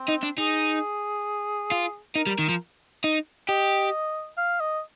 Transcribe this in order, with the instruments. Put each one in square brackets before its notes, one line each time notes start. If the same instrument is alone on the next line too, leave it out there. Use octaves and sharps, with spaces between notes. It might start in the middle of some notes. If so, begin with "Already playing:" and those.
Already playing: [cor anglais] C4
[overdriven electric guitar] D#4
D4
[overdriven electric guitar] D#4 [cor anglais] G#4
[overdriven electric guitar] F4
[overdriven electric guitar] D#4 [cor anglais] A#4
[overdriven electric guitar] G3
D#3
F3
D#4
[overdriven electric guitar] G4 [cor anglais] D#5
[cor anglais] F5
D#5